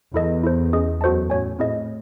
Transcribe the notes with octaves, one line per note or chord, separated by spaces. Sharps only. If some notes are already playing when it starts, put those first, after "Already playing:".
E2 E4 A4 D#5
E4 A4 C5
C#4 G#4 D#5
F#2 F#4 A4 C5 D#5 A5
A2 C#4 F#4 C#5 G#5
A2 C4 E4 G#4 C5 D#5